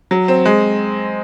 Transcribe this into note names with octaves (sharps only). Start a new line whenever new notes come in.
F#3
C4
G#3